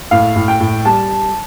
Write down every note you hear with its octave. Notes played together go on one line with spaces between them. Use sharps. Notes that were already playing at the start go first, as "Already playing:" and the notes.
A2 F5
A2
G5
A2
G3 A5